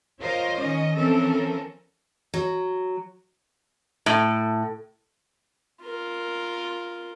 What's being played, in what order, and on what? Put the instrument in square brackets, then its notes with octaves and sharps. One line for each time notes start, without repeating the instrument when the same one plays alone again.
[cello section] F4 A#4 C5 C#5 D#5 F5
D#3 C#4 D#5
E3 F3 C4 C#4 A4 A#4
[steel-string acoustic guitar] F#3
[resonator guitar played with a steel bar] A2
[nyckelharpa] F4 A#4